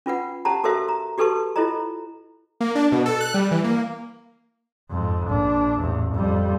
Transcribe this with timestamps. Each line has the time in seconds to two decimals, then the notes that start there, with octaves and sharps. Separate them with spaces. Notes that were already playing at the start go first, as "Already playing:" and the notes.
0.06 C#4 F4 B4 F#5
0.45 C#4 G4 C5 F#5 A5 A#5
0.64 F#4 A4 A#4 C5 E5 F5
0.89 A#5
1.18 F#4 G4 A4 B4 A5 C#6
1.56 E4 F4 A4 C5 D#5 A#5
2.60 A#3
2.75 D4
2.92 B2
3.06 A4
3.20 F#6
3.34 G3
3.51 E3
3.64 A#3
4.90 F2 G#2
5.28 A#1 D4
5.79 A1 E2
6.15 F2 G3